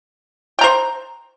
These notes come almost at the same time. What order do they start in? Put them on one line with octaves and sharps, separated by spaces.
G5 A#5 C5